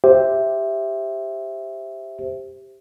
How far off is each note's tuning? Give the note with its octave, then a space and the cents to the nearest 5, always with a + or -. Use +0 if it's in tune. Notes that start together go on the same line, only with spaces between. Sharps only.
G4 +0 C5 +0 E5 +0